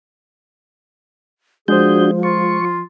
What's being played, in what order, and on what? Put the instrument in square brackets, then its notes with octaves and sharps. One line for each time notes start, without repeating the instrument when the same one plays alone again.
[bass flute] F3 [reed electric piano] G#3 C5 [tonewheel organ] D4 F#4 G6 [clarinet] G#4
[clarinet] F4 [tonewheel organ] C#6